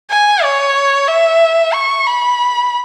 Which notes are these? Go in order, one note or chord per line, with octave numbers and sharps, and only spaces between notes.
G#5
C#5
E5
C#6
B5